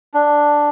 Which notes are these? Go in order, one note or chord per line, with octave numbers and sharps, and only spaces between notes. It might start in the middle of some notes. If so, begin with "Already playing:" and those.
D4